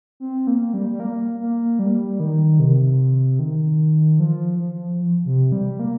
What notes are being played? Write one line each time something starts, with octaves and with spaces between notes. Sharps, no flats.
C4
A#3
G3
G3
A#3
A#3
G3
D#3
C3
D#3
F3
F3
C3
G3
A#3